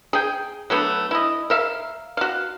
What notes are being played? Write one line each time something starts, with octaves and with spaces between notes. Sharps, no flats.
G#4 G5
F#3 A3 B3 D4
E4 D#5
A#4 E5 F5
F#4 F5